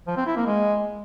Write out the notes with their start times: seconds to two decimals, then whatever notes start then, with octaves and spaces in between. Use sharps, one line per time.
0.07 F3
0.17 C4
0.27 E4
0.36 A#3
0.46 G#3